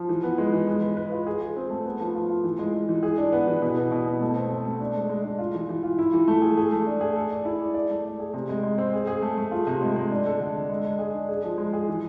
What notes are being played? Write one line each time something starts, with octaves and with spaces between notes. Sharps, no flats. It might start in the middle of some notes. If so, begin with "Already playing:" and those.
Already playing: F3
E3
B3
G#3
E3
G#3
B4
B4
F4
G#4
G#4
C4
A3
B3
F3
F4
F4
E3
G#3
G#3
E3
G#4
D4
B3
E3
B2
B3
B2
B2
A3
C4
C4
A3
D4
G#3
G#3
D4
F4
E3
E3
F4
E4
E3
A3
G#4
G#4
A3
D4
G#4
A4
D5
E4
D5
D5
A3
D5
G#4
C3
G#3
G#3
C4
G#4
G#4
A3
A3
F4
C3
G#3
G#3
D4
A4
D3
D4
G#3
G#3
G#4
D4
G#4
F3
G#3
G#4
E3